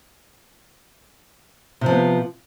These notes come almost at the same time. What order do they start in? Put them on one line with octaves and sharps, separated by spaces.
C3 F3 B3